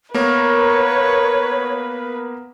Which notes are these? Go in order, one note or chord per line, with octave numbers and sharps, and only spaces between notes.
A#3 B3 A#4 B4 C#5